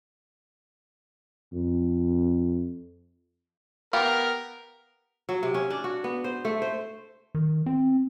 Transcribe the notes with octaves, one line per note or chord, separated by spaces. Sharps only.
F2
B3 G4 A#4 F5
F#3
C3
C#4
D4
F#4
B3
C5
A3
C5
D#3
C4